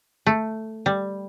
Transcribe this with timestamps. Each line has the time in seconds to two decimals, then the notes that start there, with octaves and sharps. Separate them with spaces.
0.26 A3
0.86 G3